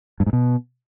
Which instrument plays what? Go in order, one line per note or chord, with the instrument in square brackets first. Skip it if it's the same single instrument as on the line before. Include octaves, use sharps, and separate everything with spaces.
[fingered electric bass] G2
G#2
B2